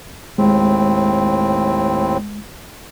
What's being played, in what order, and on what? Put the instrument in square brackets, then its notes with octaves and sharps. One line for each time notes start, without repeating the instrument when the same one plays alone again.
[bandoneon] D#2 A2 C4 [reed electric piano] G#3